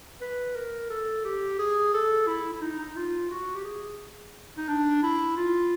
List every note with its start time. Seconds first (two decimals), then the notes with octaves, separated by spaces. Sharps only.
0.21 B4
0.55 A#4
0.90 A4
1.25 G4
1.59 G#4
1.94 A4
2.27 E4
2.53 E4
2.61 D#4
2.78 D#4
2.96 F4
3.31 F#4
3.55 G4
3.64 G#4
4.57 D#4
4.68 D4
5.03 E4
5.37 F4